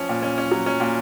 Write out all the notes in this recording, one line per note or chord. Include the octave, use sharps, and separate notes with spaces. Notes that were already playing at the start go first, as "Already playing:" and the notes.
Already playing: F3 C#4
A#2
C#4
C#4
F#3
C#4
A#2